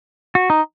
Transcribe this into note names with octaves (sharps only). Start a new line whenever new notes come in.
F#4
D#4